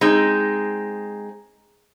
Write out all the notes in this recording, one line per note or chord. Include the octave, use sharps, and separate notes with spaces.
G#3 C4 D#4